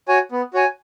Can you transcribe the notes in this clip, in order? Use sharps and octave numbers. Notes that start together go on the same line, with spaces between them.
F#4 C#5 G#5
B3
F#4 C#5 G#5